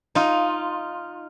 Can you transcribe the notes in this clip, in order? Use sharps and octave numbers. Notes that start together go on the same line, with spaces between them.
D#4 F4